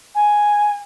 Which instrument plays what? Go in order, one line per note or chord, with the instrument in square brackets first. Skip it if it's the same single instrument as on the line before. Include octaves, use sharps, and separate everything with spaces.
[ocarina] G#5